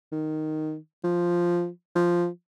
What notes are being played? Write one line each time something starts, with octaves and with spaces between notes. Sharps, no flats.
D#3
F3
F3